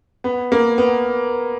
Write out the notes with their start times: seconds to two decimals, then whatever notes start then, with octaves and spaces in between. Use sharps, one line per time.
0.24 B3
0.52 A#3
0.78 B3